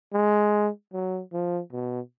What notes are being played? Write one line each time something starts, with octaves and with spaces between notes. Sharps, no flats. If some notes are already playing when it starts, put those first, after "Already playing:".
G#3
F#3
F3
B2